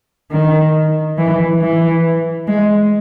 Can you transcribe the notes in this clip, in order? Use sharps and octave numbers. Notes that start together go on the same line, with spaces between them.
D#3
E3
E3
G#3